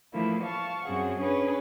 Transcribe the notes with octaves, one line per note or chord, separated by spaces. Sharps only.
E3 F3 A3 A#3 E4
F5 A5 C#6
F#2 C4 G#4 F#5
C#4 D4 G#4 B4 C#5